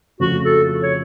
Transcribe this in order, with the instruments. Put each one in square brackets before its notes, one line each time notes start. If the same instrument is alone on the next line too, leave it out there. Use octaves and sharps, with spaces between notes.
[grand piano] F2 C#3 F3 A3 F4 [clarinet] F#4
[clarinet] A4
C#5